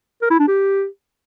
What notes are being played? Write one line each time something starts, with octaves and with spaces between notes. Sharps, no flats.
A#4
E4
D4
G4